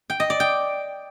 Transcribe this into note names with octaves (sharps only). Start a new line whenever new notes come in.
G5
D#5
D5
G5